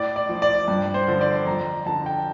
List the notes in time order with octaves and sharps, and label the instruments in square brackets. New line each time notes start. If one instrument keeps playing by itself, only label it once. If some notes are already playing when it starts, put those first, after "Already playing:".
Already playing: [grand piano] A2 D5
D5
F3
D5
G2
C5
D3 F3
D5
F2 A#5
D3 F3 A5
G5